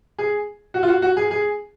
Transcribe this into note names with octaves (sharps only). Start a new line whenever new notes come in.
G#4
F#4
F4
F#4
F#4
G#4
G#4